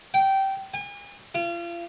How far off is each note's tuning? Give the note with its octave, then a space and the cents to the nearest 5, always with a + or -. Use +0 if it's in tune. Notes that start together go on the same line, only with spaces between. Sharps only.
G5 -15
G#5 -40
F4 -35